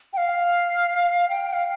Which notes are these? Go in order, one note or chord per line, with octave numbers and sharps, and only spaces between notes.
G5
F5
G5
G5
F5